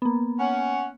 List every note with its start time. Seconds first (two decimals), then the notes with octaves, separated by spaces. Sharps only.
0.02 A#3 B3
0.39 C#4 F#5